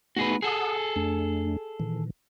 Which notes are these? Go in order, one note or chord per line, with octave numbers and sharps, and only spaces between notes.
A3 B3 D#4 F#4 G#4 B4
G#4 A4 F#5 D#6
F2 A3 D4
A#2 D#3 E3